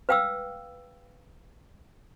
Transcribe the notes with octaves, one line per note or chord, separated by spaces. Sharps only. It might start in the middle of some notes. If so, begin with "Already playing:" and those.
B4 F5 G5 D#6 E6